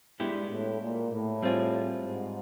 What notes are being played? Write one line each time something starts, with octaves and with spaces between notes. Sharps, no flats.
G2 G#3 B3 E4 G4
A2
A#2
A2
G3 C4 F4 G#4
G#2